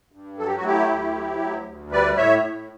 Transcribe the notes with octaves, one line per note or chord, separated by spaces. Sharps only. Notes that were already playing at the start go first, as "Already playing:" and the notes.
G2
F#3 A4
G4
F#4
A3 E4 G4
D2
F#3
D2
D2
G3 B4 D5
A2 C#5 E5
A2